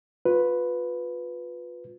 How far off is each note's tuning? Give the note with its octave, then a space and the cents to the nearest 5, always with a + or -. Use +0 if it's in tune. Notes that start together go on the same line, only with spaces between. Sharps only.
F4 +30 B4 +0